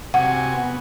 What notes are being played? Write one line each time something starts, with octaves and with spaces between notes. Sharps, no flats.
C3 F#4 F#5 G#5
B3